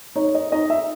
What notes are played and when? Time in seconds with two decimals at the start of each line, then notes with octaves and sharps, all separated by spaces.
0.16 D#4 C#5
0.35 D#5
0.52 D#4 D#5
0.70 E5